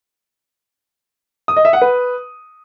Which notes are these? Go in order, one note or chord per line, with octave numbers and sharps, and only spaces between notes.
D#6
D#5
E5
F#5
B4